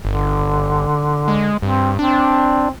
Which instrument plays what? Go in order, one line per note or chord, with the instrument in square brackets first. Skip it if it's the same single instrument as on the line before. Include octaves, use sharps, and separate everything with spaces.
[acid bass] G1 [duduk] D3
[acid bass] G#3
[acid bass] G2 [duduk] C4
[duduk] C4 [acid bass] D4